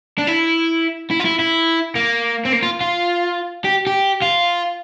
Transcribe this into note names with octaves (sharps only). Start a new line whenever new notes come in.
D4
E4
E4
F4
E4
E4
A#3
C4
A#3
F4
F4
G4
G4
F4